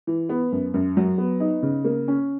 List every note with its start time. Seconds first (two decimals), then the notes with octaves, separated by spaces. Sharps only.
0.07 E3
0.29 B3
0.52 F#2
0.74 F#2
0.97 F#3
1.18 B3
1.40 D#4
1.63 C#3
1.85 A#3
2.08 C#4